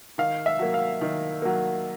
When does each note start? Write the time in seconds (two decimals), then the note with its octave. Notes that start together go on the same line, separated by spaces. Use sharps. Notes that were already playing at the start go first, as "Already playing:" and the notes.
0.18 D#3 F5
0.46 E5
0.59 F#3 A#3
0.74 F5
1.01 D#3
1.42 F#3 A#3